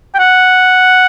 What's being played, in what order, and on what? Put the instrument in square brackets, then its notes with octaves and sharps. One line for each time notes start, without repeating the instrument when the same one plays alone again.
[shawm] G5
F#5